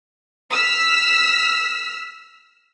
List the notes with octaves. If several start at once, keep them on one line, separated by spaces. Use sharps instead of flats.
E6 F6 B6